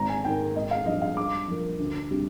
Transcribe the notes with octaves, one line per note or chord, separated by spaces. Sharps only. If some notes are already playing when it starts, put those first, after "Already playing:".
Already playing: G#1 A#5
G#5
G#2 D#3 A#3 G5
G#1 D#5
F5
G2 F3 D#5
F5
G2 D6
F3 A#3
D2
C3 G3 D4